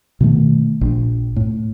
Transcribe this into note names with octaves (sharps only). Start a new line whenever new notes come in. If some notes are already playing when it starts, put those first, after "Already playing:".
B2 D#3 A3
A#1
A2